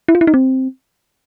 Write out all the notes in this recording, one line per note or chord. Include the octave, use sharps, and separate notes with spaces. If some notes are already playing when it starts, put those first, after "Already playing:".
E4
F4
E4
D#4
C4